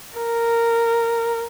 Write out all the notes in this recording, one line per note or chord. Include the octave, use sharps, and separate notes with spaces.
A#4